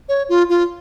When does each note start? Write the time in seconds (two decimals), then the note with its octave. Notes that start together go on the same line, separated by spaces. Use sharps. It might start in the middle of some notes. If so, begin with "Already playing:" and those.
0.09 C#5
0.29 F4
0.49 F4